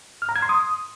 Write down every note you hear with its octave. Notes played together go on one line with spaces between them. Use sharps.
F6
A#5
G#6
C6
D#6